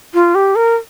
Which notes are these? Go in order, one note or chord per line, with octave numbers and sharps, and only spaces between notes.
F4
G4
A#4